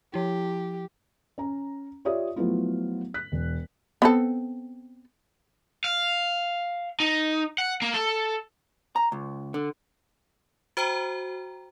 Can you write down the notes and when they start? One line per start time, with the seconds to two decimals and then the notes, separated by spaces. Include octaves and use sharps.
0.14 F3 E4 G4
1.38 C#4 A#5
2.05 F4 G4 C#5 D5 E5 D#6
2.36 F3 F#3 A3 B3 E4 F4
3.14 F#6 B6
3.32 E1
4.02 B3 C4 A4
5.84 F5
7.00 D#4
7.58 F#5
7.82 A#3
7.94 A4
8.96 A#5
9.12 C#2
9.54 D3
10.77 F#4 C5 G5 A#5